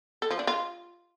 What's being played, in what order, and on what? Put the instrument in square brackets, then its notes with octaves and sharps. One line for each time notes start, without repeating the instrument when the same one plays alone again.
[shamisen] A4
F3
D4
F4